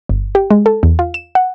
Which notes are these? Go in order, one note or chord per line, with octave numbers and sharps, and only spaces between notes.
G1
G4
G#3
A4
E2
F4
E7
F#5